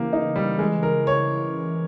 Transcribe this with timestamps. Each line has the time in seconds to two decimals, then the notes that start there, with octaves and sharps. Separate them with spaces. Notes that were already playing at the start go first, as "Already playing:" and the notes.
Already playing: C#3 E3 A#3 G4
0.13 D#4
0.36 G3
0.59 G#3
0.83 A#4
1.07 C#5